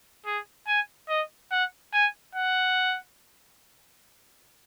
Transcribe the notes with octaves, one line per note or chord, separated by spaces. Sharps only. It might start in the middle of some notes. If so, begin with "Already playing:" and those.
G#4
G#5
D#5
F#5
G#5
F#5